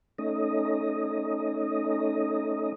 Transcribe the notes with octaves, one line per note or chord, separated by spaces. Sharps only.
A3 C#4 D#4 D#5